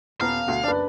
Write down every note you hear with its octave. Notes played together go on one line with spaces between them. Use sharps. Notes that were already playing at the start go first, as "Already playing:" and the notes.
D#1 B3 F5 A#5
D2 B2
F#1 D4 B4 D5